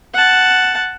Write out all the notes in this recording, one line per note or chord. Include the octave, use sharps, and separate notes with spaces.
F#5 A5